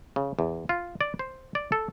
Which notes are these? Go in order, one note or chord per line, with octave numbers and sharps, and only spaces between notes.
C#3
E2
F4
D5
C5
D5
A4